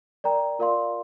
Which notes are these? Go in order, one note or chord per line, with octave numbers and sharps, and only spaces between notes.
A#4 D5 G5 A#5
F4 A#4 D5 F5 C6